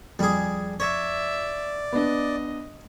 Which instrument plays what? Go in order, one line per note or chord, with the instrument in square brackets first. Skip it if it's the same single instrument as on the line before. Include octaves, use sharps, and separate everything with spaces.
[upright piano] F2 [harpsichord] G3 G#4
[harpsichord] C#5 [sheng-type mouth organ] D5 [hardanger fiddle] E5
[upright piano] B3 D4 [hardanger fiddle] D#5